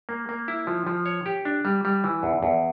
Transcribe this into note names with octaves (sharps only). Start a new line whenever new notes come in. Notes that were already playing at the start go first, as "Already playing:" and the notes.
A#3
A#3
E4
F3
F3
C#5
G4
D4
G3
G3
E3
E2
E2